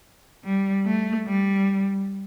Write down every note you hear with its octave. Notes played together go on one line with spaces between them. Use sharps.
G3
A3
G3